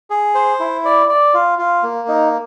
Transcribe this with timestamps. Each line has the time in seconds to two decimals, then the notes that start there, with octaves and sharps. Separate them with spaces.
0.10 G#4
0.35 C5
0.60 E4
0.85 D5
1.09 D5
1.34 F4
1.59 F4
1.83 A#3
2.08 D#4